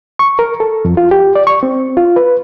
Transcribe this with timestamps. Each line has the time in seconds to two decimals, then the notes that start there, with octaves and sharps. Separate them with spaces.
0.19 C#6
0.39 A#4
0.60 A4
0.85 F2
0.97 F4
1.11 G4
1.35 D5
1.47 C#6
1.63 C4
1.97 F4
2.16 B4